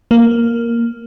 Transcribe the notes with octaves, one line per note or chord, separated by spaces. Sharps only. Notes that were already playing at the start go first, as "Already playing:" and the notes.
A#3